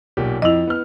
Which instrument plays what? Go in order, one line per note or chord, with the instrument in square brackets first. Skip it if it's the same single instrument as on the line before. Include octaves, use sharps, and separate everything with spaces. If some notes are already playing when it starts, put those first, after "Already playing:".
[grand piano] B1 A#2 G4
[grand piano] F2 F7 [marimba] E4 D#5
[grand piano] B3 F6